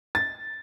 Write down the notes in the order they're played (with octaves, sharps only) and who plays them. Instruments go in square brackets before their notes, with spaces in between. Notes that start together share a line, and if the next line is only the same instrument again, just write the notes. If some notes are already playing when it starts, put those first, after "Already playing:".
[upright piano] A6